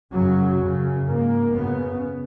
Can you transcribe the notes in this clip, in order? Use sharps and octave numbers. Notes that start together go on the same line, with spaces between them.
F#2 C#3 F#3
F#2 C#3
G#2 A#3
F#2 C#3 B3